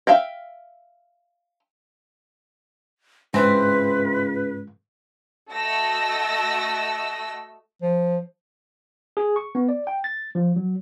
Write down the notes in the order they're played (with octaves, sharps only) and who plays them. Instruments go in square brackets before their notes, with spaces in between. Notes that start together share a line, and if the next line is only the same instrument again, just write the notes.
[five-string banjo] E5 F5 G5
[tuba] C#2 [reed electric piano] G#2 [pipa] E3 C4 [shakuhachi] B4
[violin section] A3 F#4 D#5 E6 A#6
[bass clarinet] F3
[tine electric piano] G#4
C#6
B3
D5
G5
A6
F3
F#3